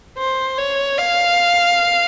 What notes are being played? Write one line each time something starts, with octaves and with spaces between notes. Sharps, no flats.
C5
C#5
F5